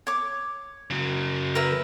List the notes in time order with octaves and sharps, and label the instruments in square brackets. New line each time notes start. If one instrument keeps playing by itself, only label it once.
[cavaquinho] C#5 D6
[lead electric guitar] C#3 F#3
[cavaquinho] A#4 B4 E5